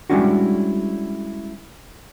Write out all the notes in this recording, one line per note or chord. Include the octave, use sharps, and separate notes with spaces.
G3 G#3 C#4 D4 E4 F#4